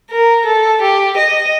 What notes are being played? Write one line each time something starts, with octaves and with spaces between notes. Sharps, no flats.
A#4
A4
G4
D#5